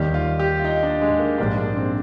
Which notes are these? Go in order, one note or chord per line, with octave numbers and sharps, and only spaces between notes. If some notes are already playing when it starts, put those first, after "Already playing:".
Already playing: D#2 D#3 G3 G4
F4
G4
F4
D#4
D4
G#3
A#3
A#1 G#2 G3 A#3 D4
D4
C4